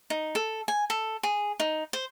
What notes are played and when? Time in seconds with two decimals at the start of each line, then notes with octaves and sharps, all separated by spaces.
0.10 D#4
0.35 A4
0.68 G#5
0.90 A4
1.23 G#4
1.60 D#4
1.93 C5